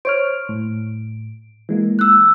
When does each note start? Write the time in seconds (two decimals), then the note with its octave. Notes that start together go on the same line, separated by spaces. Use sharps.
0.05 C5 C#5 F6 D7
0.49 A2
1.69 E3 G#3 A#3
1.99 E6 F#6